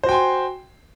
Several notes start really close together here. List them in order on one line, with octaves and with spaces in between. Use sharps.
C5 F#4 G5 G#5 C6